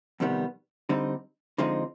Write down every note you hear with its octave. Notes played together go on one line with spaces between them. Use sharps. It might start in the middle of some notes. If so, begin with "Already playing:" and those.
F2 C3 D#3 G3 B3
D3 G3 C4 D#4
D3 F3 G#3 C4 D#4